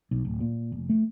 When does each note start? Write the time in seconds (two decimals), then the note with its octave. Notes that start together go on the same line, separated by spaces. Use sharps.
0.11 B1
0.25 D1
0.40 A#2
0.72 F1
0.89 A3